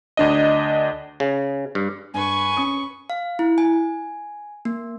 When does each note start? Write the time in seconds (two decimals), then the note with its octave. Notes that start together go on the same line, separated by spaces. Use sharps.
0.17 D2 D4 D#5
1.20 C#3
1.75 G2
2.14 G2 B4 G#5 C#6
2.57 C#4 D#6 C#7
3.10 F5
3.39 E4
3.58 G#5
4.65 A#3